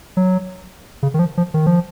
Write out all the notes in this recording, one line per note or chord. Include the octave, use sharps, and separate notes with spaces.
F#3
C#3
D#3
F3
F3
D#3
F3